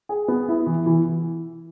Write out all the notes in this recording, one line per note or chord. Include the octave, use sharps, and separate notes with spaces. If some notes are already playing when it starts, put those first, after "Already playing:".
G#4
B3
E4
E3
E3